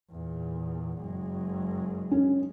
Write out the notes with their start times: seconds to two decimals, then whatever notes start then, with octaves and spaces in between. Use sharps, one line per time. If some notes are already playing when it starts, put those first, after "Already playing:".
0.11 E2 A#2
0.99 F#1 G#3
2.11 C#4